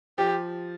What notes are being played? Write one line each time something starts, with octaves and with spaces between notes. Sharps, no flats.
F3 G4